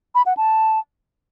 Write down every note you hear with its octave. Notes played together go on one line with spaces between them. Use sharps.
B5
F#5
A5